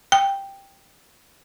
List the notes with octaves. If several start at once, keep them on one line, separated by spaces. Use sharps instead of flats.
G5